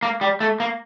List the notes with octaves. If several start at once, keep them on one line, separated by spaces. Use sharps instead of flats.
A#3
G3
A3
A#3